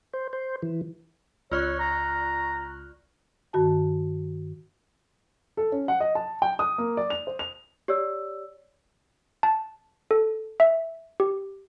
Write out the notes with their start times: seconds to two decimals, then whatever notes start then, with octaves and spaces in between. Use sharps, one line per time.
0.13 C5
0.33 C5
0.62 E3
1.51 C#2 F4 C#5 D5 C#6 F6 F#6
1.79 A#5
3.53 G2 D#3 F#4 A5
5.57 A4
5.72 C#4
5.88 F#5
6.00 D#5
6.15 A5
6.42 G5
6.59 D#6
6.78 A#3
6.97 D5
7.10 F7
7.27 C5
7.39 F7
7.88 G4 C#5 D5 E6
9.43 A5
10.11 A4
10.60 E5
11.20 G4